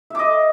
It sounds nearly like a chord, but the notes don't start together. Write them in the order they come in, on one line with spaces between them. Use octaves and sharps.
E5 D6 D#5